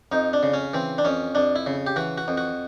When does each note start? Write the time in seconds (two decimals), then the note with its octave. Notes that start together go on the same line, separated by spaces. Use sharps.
0.12 F2 D#4
0.33 D4
0.43 C#3
0.54 C#4
0.73 E3 C4
0.98 D4
1.05 F2 C#4
1.35 F2 D4
1.56 E4
1.66 C#3
1.87 G4
1.96 E3 F#4
2.18 F#4
2.28 F2
2.37 F#4